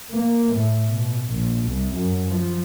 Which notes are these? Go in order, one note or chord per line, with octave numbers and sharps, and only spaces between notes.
A#3
A2
B2
A#1
C2
F#2
F3